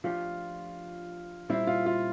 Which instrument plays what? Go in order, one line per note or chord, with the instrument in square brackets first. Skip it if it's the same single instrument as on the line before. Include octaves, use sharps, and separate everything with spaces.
[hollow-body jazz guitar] F3 A3 D4 G4 [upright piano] F4
[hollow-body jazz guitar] A#2 G3 C4 [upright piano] E4
[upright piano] F4
F4